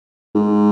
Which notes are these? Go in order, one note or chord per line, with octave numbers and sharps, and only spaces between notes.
G#2